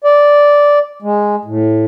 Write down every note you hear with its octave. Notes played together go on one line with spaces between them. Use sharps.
D5
G#3
A2